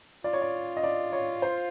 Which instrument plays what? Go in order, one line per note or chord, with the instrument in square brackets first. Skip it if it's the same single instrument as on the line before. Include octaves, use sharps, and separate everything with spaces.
[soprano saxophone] F4 [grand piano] D5
[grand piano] C#5
D5
D#5
D5
C#5
C5